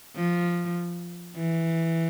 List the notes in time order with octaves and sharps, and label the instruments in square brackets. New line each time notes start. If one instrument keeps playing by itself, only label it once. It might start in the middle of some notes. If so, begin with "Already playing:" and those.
[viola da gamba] F3
E3